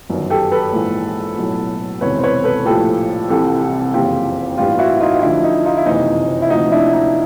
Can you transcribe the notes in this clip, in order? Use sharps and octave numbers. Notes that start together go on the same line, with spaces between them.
G1 F#2 D#3
G4 A4
A4 B4
A#1 G#2 E3
B1 A2 F#3
E1 E2 C3 D#3 B4 C#5
C5
B4 C#5
A4 B4
A#1 A2 F3 G4 A4
C2 C3 E3 G4 A4
F#1 F2 C#3 E3 F4 G4
A1 G2 E3 F4 G4
E4 F#4
D#4 F4
D2 D3 F3 D4 E4
D#4
D#4 F4
E4
F#1 F2 C3 E3 D#4
E4
D2 C3 F3 D#4
D4 E4
D#4